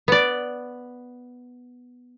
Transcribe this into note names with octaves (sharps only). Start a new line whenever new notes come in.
B3 D5